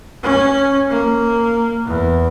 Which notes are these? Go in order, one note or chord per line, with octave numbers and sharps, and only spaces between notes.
C#4
A#3
E2